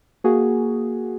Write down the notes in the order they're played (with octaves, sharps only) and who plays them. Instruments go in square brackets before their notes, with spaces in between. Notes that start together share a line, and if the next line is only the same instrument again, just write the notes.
[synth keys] A#3 F#4 G#4